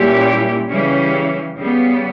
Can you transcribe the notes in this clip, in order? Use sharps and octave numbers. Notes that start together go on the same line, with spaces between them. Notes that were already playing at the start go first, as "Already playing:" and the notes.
Already playing: A#2 G3 C#4 E4 G4
C#3 E3 G3 C#4
C#3 G3 B3